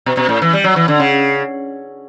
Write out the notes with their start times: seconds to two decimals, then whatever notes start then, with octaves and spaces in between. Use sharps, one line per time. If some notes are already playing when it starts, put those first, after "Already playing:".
0.06 B2
0.17 B2
0.29 A2
0.42 E3
0.53 G3
0.64 F#3
0.76 E3
0.88 D3
1.00 C#3